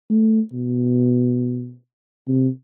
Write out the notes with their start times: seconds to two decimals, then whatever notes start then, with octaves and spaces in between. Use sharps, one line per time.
0.10 A3
0.52 B2
2.28 C3